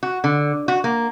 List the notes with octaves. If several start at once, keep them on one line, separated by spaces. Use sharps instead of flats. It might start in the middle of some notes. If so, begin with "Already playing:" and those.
F#4
D3
F#4
A#3